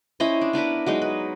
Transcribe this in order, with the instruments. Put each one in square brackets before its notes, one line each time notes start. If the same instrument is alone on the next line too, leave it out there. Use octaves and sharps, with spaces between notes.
[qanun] C#4 E4 C5 D#5
D4
B3 D4 A#4 B4
F#3 G#3 D#4
B4